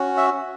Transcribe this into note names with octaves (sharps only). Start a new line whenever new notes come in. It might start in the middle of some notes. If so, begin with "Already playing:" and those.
Already playing: C#4 F#4
E5